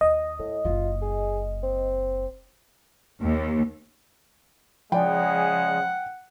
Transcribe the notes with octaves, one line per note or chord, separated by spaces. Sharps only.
D#2 D#5
A2 A3
F#1 A#3 F4
G#4
C4
D#2
C#3 F3 G#3 D5 F#5 G5